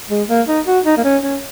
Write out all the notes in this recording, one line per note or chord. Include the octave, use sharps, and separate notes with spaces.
G#3
A#3
D#4
F#4
D#4
A#3
C#4
C#4